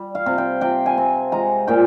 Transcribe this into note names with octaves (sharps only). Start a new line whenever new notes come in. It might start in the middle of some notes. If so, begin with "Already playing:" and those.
Already playing: G3
F5
C3
G5
C3 G5
G#5
C4
G#3 A#5
A#2 G5